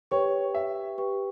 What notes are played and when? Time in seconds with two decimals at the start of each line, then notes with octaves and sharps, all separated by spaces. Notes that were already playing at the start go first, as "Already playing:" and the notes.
0.11 G4 B4 C#5 G5 C#6
0.54 E5
0.98 G4 B4 G5 C#6